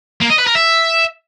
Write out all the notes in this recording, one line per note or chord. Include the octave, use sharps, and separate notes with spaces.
A#3
D#5
B4
A#4
E5